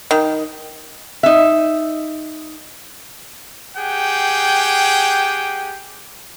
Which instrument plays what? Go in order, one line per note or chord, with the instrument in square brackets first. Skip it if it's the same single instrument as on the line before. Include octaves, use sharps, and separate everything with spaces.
[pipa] D#3
[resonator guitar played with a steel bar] D#4 E5
[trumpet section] G4 G#4 F#5 G5